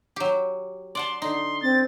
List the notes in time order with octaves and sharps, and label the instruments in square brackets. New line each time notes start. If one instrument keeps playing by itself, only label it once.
[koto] F#3 G4
[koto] D5 F#5 A5 [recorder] C6
[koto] D3 D#4 [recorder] C6
[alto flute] C4 [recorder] A6